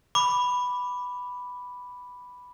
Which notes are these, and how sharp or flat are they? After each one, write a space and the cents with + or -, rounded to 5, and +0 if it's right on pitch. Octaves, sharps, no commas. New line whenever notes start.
B5 +0 D6 +0